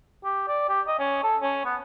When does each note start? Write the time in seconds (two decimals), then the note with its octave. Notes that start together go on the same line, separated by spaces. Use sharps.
0.24 G4
0.48 D5
0.69 G4
0.88 D#5
0.99 C#4
1.24 A4
1.42 C#4
1.65 B3